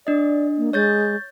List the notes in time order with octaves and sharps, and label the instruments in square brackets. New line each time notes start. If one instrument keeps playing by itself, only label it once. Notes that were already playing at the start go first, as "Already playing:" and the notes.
[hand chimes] D4 D#5 [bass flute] D5
[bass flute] A#3
[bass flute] G#3 [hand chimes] C#5 G6 A6